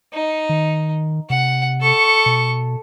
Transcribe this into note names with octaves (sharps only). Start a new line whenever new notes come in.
D#4
D#3
C3 F#5
A4 C#6
B2